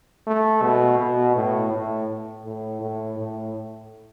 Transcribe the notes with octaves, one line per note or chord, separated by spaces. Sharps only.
A3
B2
B2
A2
A2
A2
A2
A2